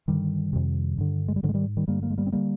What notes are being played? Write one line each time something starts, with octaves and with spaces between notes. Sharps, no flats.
G2 D3 D#3 G3
F2 C3
G2 D3
G#3
G3
G#2 D3 F3
G#3
D#3 G3
D#3 G3
G2 D3 G3 A#3
G3 A#3
G#3
G3 A#3
C4
D3 G3 A#3